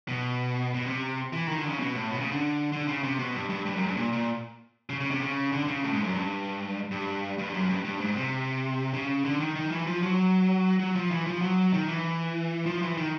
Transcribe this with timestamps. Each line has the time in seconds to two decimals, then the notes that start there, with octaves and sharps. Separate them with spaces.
0.08 B2
0.74 B2
0.86 C3
1.33 E3
1.48 D#3
1.58 D3
1.69 C#3
1.79 B2
1.95 A2
2.10 B2
2.20 C#3
2.31 D3
2.72 D3
2.88 C#3
3.03 C3
3.19 B2
3.34 G2
3.50 G2
3.65 G2
3.76 F#2
3.86 G2
3.97 A#2
4.12 A#2
4.90 C#3
5.00 C#3
5.11 C3
5.21 C#3
5.52 D3
5.67 C#3
5.83 A2
5.93 G#2
6.04 F#2
6.14 G2
6.91 G2
7.38 G2
7.54 F#2
7.69 G2
7.85 G2
8.00 G#2
8.16 C3
8.94 C#3
9.25 D3
9.40 D#3
9.56 D#3
9.71 E3
9.87 F3
10.03 F#3
10.80 F#3
10.95 F3
11.11 E3
11.27 F3
11.42 F#3
11.73 D#3
11.89 E3
12.66 F3
12.82 E3
12.97 D#3